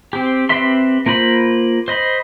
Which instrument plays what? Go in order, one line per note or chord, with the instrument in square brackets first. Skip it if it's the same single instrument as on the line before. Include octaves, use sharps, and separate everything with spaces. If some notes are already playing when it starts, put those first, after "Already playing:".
[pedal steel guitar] C4 G4
C4 G4 B4 E5 C6
A#3 F4 C5 B5
C5 D#5 B5